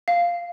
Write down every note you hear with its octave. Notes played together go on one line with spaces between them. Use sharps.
F5